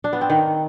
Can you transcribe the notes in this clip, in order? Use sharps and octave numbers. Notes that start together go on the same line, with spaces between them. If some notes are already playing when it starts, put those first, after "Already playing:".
D4
B3
C4
D#3